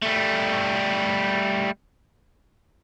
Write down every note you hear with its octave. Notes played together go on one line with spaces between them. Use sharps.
G3 A3